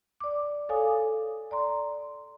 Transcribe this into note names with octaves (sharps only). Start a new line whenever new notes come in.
D5 D6
A4 C#5 F5 G#5 D6 D#6
D5 A#5 C6